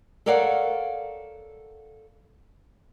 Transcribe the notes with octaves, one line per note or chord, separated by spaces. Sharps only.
A4 A#4 C#5 D5 F5 F#5